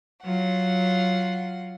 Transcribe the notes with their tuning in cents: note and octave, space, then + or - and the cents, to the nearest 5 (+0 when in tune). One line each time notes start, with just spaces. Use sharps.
F#3 +0 F4 +0 F#5 +0